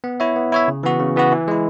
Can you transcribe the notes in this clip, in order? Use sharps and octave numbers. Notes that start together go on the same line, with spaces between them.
B3
E4 C#5 E5
B3
E4 C#5 E5
C#3
E3 B3 F#4
C#3
E3 B3 F#4
E3
G#3 E4